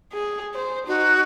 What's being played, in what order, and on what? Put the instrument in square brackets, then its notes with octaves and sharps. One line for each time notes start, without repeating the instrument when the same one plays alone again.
[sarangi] G#4
C5
[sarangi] D#4 [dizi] F#4